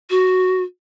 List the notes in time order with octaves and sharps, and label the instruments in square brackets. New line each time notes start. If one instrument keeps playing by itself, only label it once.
[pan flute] F#4